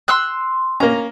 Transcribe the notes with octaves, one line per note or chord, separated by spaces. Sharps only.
C6 E6 F#6
A#3 C#4 A#5